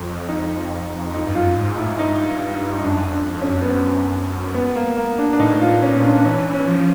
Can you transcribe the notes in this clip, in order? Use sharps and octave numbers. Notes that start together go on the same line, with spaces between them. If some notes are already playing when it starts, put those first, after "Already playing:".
Already playing: F2
D#4
D#4
G2
F#2 F4
G#2
A2 E4
G#2
G2 D#4
D#4
F#2 D4
F2
D4
F2
C#4
F#2
B3
C4
B3
A#3
A#3
D4
D4
A2 D#4
F4
A#2 C#4
C#4
D4
D4
E3 C#4
C#4
F3